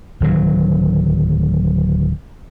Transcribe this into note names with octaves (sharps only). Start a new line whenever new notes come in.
D1 D#3 F#3